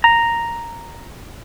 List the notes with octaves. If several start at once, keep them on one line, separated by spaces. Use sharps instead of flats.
A#5